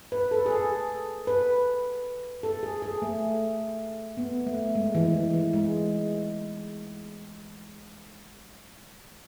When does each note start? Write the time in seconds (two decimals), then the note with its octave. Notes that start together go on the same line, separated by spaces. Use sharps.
0.12 B4
0.31 A4
0.46 G#4
0.50 A4
1.27 B4
2.43 A4
2.63 G#4
2.82 G#4
3.02 A3
4.17 B3
4.47 A3
4.75 G#3
4.95 E3
5.14 E3
5.33 E3
5.53 G#3